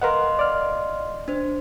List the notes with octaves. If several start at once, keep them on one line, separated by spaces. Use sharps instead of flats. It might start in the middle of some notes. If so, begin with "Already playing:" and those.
A#4 B4 D#5 F5 F#5 C6
D5 F6
D4 C5